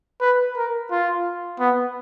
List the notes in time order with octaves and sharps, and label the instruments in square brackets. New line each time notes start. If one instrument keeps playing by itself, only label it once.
[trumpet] B4
A#4
F4
B3